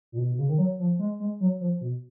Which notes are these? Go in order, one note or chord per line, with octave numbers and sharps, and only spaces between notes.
A#2
B2
B2
C#3
D#3
F#3
F3
G#3
G#3
F#3
F3
B2